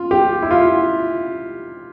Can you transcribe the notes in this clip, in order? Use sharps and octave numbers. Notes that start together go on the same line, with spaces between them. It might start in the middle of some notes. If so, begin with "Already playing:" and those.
Already playing: F4
G4
E4
F4